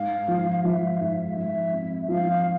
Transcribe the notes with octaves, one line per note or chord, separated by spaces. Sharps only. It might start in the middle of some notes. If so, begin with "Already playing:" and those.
Already playing: G#2 F5
F3
F3 E5
F5
G#2 E5
F5
F3 E5
C4
F3 F5